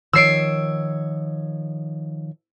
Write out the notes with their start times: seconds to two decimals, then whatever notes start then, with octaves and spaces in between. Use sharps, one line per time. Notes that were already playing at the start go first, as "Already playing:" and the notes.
0.13 D#3 F3 C#5 E6 C7 D7